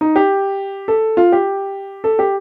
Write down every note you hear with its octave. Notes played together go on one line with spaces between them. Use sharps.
D#4
G4
A4
F4
G4
A4
G4